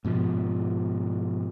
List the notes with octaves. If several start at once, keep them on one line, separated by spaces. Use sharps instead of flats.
G#2 B2 F3